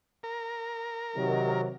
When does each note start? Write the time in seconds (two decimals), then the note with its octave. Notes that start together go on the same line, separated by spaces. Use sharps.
0.23 A#4
1.16 C3 D#3 F#3